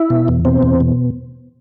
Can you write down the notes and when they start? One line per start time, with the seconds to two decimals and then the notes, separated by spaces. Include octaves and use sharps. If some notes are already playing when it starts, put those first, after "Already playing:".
Already playing: E4
0.10 B2
0.28 E2
0.45 B2 C4
0.63 E2
0.80 B2